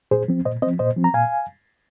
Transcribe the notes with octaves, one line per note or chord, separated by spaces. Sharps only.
A#2 G#4 C5
F3 C4
A#2 C5 D#5
F3 C4 C5 D#5
A#2 C5 D#5
F3 C4
A#5
A#2 F5 G#5